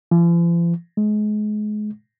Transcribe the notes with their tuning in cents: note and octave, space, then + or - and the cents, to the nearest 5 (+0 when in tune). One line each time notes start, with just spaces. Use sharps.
F3 -45
G#3 +30